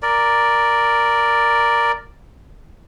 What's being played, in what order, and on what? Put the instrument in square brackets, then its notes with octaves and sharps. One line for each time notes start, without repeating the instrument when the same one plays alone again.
[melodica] A#4 D5